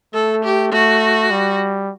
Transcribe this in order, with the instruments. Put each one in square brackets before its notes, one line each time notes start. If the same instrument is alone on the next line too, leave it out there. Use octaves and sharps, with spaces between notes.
[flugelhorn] A3 [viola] A4
[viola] G4
[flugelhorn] A3 [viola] F#4
[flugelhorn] G3